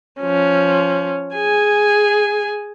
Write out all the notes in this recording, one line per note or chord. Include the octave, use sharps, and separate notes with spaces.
F3 C#4
G#4 G#5